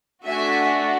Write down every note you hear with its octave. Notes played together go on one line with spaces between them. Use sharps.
A3 D4 F#4 E5 G#5